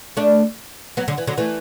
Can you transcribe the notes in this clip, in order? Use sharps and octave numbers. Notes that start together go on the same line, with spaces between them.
A3 D4
F#3 B3
D3 F#3
E3
D3 F#3
E3 A3